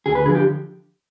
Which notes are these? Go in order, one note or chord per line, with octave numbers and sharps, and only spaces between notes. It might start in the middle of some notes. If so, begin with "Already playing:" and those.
D2 G#4
B4
D3 F3 G#4
G4